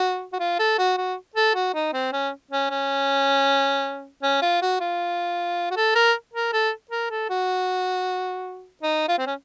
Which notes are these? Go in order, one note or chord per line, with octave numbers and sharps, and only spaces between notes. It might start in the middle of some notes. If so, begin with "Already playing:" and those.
Already playing: F#4
F#4
F4
A4
F#4
F#4
A4
F#4
D#4
C4
C#4
C#4
C#4
C#4
F4
F#4
F4
F#4
A4
A#4
A#4
A4
A#4
A4
F#4
D#4
F4
C4
C#4